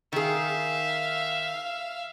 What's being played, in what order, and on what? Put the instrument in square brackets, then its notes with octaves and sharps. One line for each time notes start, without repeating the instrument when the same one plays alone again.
[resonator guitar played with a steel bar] D#3 G#4 [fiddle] E5 F5